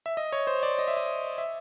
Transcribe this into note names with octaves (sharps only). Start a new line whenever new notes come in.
E5
D#5
C#5
C5
D5
D#5
E5
D#5
E5